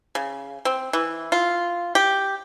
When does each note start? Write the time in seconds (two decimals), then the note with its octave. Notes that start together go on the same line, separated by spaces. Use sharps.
0.15 C#3
0.65 C4
0.93 E3
1.32 F4
1.95 G4